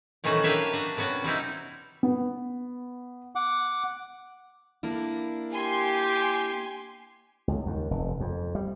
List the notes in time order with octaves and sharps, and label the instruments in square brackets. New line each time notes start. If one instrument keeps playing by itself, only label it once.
[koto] A#2 D#3 E3 A3 C#4 F#4
A#3 D4 G4 B4 C#5 E5
D4 F#4
C3 B3 C#4 F#4
G3 C4 D#4 E4
[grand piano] B3
[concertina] F#5 D6
[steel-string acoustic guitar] A#3 D4 E4
[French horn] G4 [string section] G#5 C6
[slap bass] C#2
D#2
F1
F2
G3